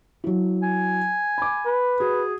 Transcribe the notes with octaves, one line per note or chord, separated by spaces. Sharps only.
F#3 E4
G#5
B5 D6
B4
F#4 G#4